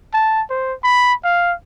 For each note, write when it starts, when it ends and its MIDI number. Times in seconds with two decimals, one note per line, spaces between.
0.14 0.42 81
0.50 0.74 72
0.84 1.14 83
1.24 1.53 77